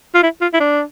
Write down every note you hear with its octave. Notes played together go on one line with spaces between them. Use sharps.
F4
E4
F4
E4
D4